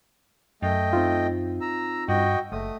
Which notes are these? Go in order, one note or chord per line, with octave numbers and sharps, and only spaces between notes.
F#2 A3 D#5 G5
C4 D#4 F4
A#5 E6
G2 F#4 D#5 G5
F#1 A3 D#6